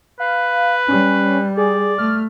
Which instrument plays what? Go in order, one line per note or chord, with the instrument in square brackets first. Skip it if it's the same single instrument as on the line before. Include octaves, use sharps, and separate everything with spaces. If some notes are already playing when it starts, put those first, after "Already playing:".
[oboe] B4 [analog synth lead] F5
[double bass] G3 [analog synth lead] C#4
[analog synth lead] G#4 [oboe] D5
[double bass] A3 [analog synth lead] F6